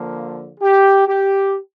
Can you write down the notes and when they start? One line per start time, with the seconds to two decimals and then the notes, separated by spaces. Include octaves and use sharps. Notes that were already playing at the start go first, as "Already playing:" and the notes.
Already playing: D3 F3 A#3
0.60 G4
1.08 G4